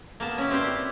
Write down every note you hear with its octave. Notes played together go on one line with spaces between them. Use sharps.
A#3 B3 A5
C#4 E4
C4 G4 B4 C5 D5
G4